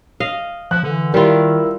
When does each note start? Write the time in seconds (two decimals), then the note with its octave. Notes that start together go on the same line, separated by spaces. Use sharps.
0.20 D#5 F5
0.71 F3 F#6
0.83 D3 E3
1.14 D#3 G3 E4 F4 A#4